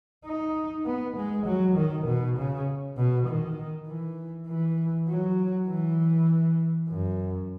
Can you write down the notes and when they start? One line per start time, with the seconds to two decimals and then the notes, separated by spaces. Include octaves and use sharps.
0.26 D#4
0.86 B3
1.17 G#3
1.46 F#3
1.76 D#3
2.07 B2
2.37 C#3
2.97 B2
3.27 D#3
3.87 E3
4.47 E3
5.08 F#3
5.68 E3
6.88 F#2